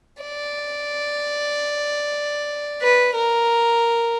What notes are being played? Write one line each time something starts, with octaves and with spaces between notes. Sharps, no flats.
D5
B4
A#4